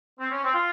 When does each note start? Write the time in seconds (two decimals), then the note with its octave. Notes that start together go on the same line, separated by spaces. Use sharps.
0.20 C4
0.31 C#4
0.43 C4
0.54 F4